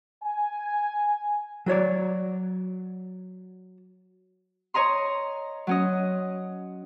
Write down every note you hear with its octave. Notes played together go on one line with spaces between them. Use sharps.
G#5
F#3 F#4 C#5 D5
C#5 D#5 A#5 C6
F#3 C#4 D#5